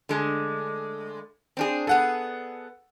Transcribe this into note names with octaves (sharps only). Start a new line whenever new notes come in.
D3 G#3 A3
C4 D4 G#4
B3 G#4 A4 F#5